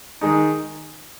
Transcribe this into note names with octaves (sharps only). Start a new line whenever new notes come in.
D#3 G#3 D#4